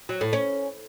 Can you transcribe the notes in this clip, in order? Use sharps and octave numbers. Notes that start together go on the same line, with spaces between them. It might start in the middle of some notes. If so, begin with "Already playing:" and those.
F#3
A2
C#4